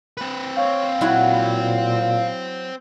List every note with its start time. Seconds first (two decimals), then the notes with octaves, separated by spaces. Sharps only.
0.17 C4 B4
0.56 C#5 F5
1.01 A#2 F#3 E4 F#4